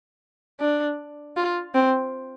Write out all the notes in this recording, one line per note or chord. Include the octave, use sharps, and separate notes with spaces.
D4
F4
C4